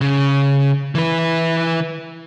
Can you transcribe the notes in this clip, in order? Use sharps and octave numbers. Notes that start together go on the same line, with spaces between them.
C#3
E3 B4